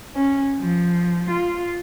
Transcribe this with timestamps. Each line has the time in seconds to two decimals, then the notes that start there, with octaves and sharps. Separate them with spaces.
0.15 C#4
0.59 F3
1.31 F4